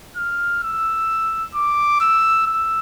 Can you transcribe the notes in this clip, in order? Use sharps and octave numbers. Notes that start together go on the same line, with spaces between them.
F6
E6
D6
E6
E6